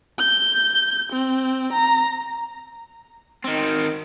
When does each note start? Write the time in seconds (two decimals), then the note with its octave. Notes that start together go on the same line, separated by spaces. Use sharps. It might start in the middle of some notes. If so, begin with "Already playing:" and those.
0.19 G6
1.12 C4
1.73 A#5
3.45 D#3 C4